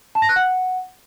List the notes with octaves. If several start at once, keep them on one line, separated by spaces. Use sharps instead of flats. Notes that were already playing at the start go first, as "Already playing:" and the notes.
A5
A#6
F#6
F#5